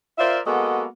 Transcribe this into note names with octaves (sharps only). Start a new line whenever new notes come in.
F4 A#4 C5 D5 E5
G#3 A#3 B3 F#4 A4 D#5